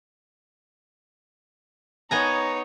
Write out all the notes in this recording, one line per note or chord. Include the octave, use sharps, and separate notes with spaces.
B3 D#4 C#5 G#5 A#5